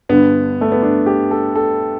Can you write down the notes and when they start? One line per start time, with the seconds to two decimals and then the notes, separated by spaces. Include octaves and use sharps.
0.09 G2 D3 B3
0.61 A3
0.72 B3
0.82 D4
1.06 G4
1.31 A4
1.56 A4